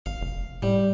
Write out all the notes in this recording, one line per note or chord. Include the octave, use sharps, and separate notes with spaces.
G#1 F5
F1
A2 G3